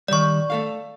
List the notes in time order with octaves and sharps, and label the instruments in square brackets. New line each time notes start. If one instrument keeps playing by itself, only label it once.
[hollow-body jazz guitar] D#3 G3 [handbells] D5 C#6
[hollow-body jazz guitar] A3 A4 F5